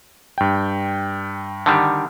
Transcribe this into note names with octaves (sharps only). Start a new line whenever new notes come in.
G2 G5
D3 D#3 G3